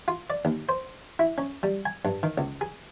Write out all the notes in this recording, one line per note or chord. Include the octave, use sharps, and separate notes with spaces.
F4
D5
D#2
C5
E4
C#4
G3
G#5
G2
D#3
C#2
G#4